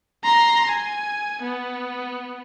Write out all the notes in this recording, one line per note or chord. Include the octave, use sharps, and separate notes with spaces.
A#5 C6
G#5
B3